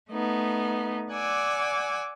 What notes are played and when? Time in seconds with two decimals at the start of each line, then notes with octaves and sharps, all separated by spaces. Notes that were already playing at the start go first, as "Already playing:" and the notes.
0.11 A3 B3 D#4
1.12 D5 F#5 G#5 D6 E6